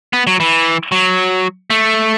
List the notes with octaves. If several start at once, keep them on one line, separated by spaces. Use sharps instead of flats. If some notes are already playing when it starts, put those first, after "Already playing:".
B3
F#3
E3
F#3
A3